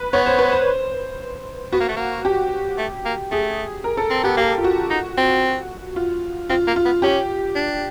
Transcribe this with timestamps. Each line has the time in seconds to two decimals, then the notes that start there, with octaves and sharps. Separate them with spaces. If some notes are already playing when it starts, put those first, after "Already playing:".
Already playing: B4
0.13 B3 C#5
0.26 C5
0.39 B4
0.52 C5
1.72 B3 F#4
1.80 A#3
1.88 A3
1.96 A#3
2.25 G4
2.78 A3
3.05 A#3
3.31 A3 G#4
3.84 A#4
3.97 A4
4.10 C4
4.24 B3 G4
4.37 A#3 G4
4.58 F4
4.64 F#4
4.90 D#4
5.17 C4
5.96 F4
6.49 C4 F4
6.67 A#3
6.76 F4
6.85 B3
7.02 C#4 G4
7.55 D4